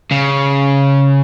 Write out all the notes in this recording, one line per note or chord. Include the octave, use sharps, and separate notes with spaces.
C#3